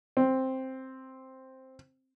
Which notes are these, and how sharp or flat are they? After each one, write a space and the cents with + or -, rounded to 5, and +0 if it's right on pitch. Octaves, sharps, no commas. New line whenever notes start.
C4 +5